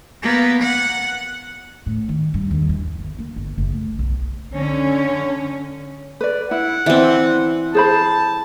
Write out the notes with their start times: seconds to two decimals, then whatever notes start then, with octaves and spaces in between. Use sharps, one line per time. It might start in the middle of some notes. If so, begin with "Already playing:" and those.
0.23 A#3 B3
0.62 F#5
1.86 A2
2.09 D#3
2.34 G2
2.51 D#2
2.69 E3
2.99 G1
3.19 A#3
3.36 G1
3.58 F#1
3.72 A3
3.99 B1
4.52 D3 C#4
6.21 B4 D5
6.51 E4 F#5
6.86 E3 C4 B4 D5 E5
7.75 G#4 C5 A5 B5